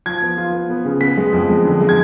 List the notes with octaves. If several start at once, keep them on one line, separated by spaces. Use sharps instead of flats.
F3 G#6
B3
F4
B3
B3
C#3
B3 B6
G#3
F2
G#3
D3
G#3
G#6